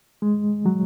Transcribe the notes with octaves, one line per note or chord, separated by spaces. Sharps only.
G#3
F#3